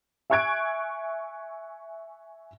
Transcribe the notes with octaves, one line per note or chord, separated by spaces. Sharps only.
E5 G#5 C#6 F#6 G#6 D7